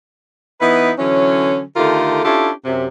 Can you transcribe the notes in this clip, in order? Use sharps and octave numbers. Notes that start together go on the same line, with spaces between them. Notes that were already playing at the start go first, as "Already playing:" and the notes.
E3 B3 D#4 E4 B4
D3 E3 F#3 C#4
D3 D#3 A3 F4 G4 A#4
C#4 D4 E4 F4 G4 A4
F#2 C3